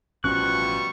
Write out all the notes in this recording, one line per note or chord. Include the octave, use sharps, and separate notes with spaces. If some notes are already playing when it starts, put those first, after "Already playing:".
A1 B2 F3 G3 C#4 C#6 F#6